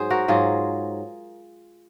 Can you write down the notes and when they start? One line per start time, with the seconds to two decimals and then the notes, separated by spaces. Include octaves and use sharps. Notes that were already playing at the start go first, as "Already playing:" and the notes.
Already playing: G#2 F#3 G#4 C5
0.10 F#4 A#4
0.28 G#2 F#3 F4 G#4